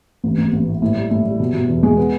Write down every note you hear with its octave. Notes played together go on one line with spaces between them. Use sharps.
A1
A1
A1
A2
A2
G3
A2
G3
B2
B2
E2
G#3
B3